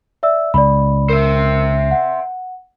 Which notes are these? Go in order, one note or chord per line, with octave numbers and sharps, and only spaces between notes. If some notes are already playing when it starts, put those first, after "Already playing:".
D5 E5 E6
C#2 D5 B5
A#4 C5 E5
F#5